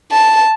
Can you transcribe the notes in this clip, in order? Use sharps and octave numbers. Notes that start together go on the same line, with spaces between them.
A5